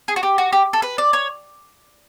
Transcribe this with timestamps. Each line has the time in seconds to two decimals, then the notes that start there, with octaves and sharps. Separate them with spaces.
0.08 G#4
0.16 F#4
0.23 G4
0.38 F#4
0.53 G4
0.73 A4
0.82 B4
0.98 D5
1.13 C#5